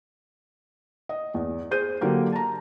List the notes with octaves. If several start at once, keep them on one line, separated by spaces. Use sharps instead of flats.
D#5
E2
G#4 C5 G6 D#7
D3 F#3 A#3 G4
A5 A#5